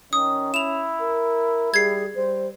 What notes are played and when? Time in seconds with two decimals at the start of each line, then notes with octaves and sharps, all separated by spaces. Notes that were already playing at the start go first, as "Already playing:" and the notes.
0.13 D#3 C#4 D#6
0.54 E4 E7 F7
1.01 A#4
1.74 G3 G#4 G#6 C7
2.15 G3 C5